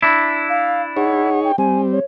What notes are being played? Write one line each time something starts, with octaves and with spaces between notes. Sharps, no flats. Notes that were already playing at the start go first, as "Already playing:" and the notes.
D4 E4
F5
D#4 G#4 C#5 F#5
G5
G3 C4 G#5
C#5